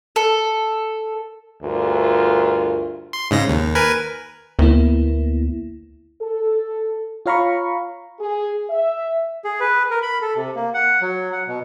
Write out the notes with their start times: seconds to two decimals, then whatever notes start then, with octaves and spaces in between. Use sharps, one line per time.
0.16 A4
1.63 D2 G2 F4 G#4 A#4
3.13 C6
3.31 G#2 C#3 A#6
3.49 D#2
3.75 A#4 B4 G#5
4.59 D2 A#3 B3 E4
6.21 A4
7.26 F4 C#5 F5 A#5 B5 C#6
8.20 G#4
8.70 E5
9.44 G#4
9.60 B4
9.91 A#4
10.03 B5
10.22 A4
10.36 C3
10.55 A#3
10.74 F#5
11.01 F#3
11.32 F#5
11.47 B2